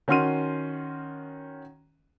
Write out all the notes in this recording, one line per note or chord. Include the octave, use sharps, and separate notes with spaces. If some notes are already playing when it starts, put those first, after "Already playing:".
D#3 C#4 F#4 C6 F6 D#7